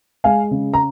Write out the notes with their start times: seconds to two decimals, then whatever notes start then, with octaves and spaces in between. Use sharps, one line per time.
0.24 G#3 F5 G#5
0.51 C#3
0.74 A#5